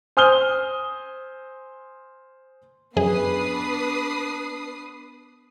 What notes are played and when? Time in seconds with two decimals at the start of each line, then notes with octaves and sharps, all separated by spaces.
0.17 C5 G#5 D#6 F6 G6 G7
2.97 F#2 B3 D4 G#4 B4 D#6 C7